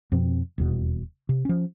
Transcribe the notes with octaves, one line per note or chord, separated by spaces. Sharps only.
F2 B2 F3 C4
D#1 E2 B2
C3
F3 C#4